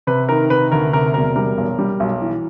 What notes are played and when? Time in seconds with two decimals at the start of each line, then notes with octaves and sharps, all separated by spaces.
0.07 C3 B4
0.29 D#3 A#4
0.50 C3 B4
0.72 D2 A#4
0.93 C3 A#4
1.14 E1 A#4
1.36 G3 A#4
1.58 B1
1.79 G3
2.00 B1
2.22 E3